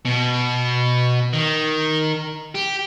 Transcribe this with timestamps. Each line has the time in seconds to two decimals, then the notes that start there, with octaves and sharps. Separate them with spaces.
0.05 B2
1.33 D#3
2.55 G4